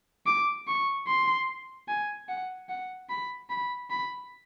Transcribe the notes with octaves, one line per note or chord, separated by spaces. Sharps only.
D6
C#6
C6
G#5
F#5
F#5
B5
B5
B5